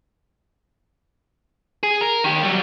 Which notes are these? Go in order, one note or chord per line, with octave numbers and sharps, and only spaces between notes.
G#4
A#4
D#3 G4
F#3 G3